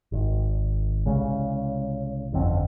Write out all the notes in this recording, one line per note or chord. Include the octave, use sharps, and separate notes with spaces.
G#1
C2 C#3 G#3
G1 F2 D3 C4